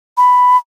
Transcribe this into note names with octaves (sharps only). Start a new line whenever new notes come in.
B5